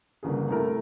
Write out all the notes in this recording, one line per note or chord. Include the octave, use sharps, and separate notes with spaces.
G1 C2 C#3 A#3 G#4
C3 A3 E4 A#4